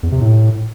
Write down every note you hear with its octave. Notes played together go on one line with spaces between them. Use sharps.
E2
C3
A2